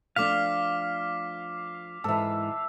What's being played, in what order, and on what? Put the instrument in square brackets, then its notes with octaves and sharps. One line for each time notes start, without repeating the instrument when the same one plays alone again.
[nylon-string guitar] F3 A3 D4 [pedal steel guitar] F5 [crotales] D6 F6 B6
[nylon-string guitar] G#2 E3 [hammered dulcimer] A4 E5